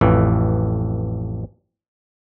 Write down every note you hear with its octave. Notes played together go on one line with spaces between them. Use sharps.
A1 F2 E3